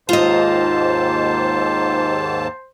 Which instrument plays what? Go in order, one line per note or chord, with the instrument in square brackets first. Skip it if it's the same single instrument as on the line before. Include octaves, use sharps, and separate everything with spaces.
[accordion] D#2 G#2 A5 [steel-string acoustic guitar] F4 D#5 [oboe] C5